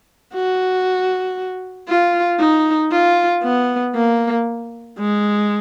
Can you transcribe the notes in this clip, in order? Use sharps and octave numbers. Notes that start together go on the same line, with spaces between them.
F#4
F4
D#4
F4
B3
A#3
G#3